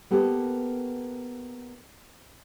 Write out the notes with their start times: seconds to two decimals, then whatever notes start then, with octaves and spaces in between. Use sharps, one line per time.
0.11 A#3 B3 G4 A4